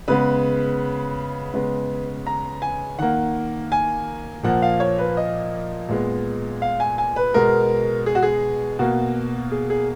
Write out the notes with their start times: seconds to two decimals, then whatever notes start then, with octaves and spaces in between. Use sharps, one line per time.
0.08 C#3 G#3 B3 B4
1.54 C#3 G#3 B3
2.27 A#5
2.62 G#5
2.98 D#3 A#3 F#5
3.72 G#5
4.43 A#2 F3 A#3 F#5
4.62 F5
4.80 C#5
4.98 B4
5.17 D#5
5.88 A#2 G#3 B3
6.62 F5
6.80 G#5
6.98 G#5
7.16 B4
7.34 B2 G#3 B3 A#4
8.06 G#4
8.15 F#4
8.23 G#4
8.79 B2 A#3 F#4
9.52 G#4
9.70 G#4